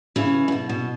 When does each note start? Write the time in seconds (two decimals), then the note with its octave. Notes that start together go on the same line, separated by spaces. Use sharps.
0.16 C#3 E3
0.48 A2
0.52 B2
0.69 B2